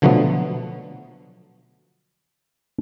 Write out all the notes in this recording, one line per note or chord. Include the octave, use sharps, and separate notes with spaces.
B2 D3 F3 F#3 A3 B3